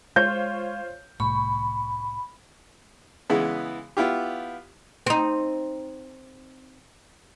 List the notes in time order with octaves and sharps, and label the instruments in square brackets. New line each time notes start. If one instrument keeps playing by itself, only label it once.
[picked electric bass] G#3 [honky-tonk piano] F4 C5 C#5 [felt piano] G6
[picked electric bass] C2 A2 [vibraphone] B5 [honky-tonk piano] C#6
[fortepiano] C#3 E3 G#3 B3
B3 E4 F4 G4
[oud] C4 D#4